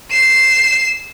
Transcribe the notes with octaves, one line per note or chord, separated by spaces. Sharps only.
C7 E7